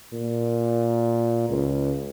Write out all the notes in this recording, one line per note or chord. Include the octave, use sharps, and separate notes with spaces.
A#2
C#2